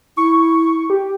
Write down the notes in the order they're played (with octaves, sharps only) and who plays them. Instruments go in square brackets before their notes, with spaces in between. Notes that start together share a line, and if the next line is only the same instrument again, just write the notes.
[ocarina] E4 [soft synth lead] C#6
[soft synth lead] G4